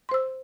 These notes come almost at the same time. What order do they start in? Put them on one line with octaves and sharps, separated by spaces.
C6 C5 E6